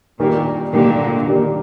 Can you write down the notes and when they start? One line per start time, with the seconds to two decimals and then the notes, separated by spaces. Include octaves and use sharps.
0.20 A#2 D#3 G3 A#3 D4 G4
0.73 A#2 D3 D#3 G3 A#3 D4 G4
1.26 D#3 G3 A#3 D4 G4